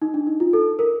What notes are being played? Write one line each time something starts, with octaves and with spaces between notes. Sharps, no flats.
D#4
D4
D#4
F4
A4
A#4